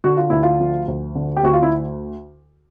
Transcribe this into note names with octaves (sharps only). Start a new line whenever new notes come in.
D3 F#4
F4
D2 E4
F4
F3
D2
D3
G4
D2 F#4
F4
E4